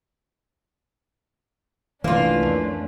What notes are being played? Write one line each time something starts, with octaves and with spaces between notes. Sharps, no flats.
C2 E3 A3 A#3 C#4 D4 F4
F2